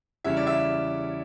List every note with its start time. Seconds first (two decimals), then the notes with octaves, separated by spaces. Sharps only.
0.24 E2 C#3 G3 C#4 E4 E5
0.36 D5
0.47 E5